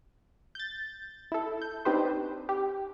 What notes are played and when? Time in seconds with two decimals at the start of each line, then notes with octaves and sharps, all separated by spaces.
0.55 G6 A6
1.32 E4 A4
1.62 G6
1.85 C4 D4 D#4 G4 B4 C5
2.49 G4